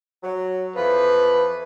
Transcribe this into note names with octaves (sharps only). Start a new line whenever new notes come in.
F#3
F2 E3 F3 B4